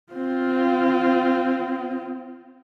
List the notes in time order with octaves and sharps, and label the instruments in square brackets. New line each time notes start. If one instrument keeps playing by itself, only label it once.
[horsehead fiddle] C4 F4